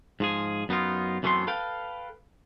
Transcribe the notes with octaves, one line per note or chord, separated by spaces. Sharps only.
G#2 F3 G#4
F#2 B3 D#4 F4
F#2 E3 A3 B3 C4 C6
A4 B4 F5 G5